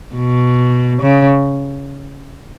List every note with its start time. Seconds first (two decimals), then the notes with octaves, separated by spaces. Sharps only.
0.15 B2
1.02 C#3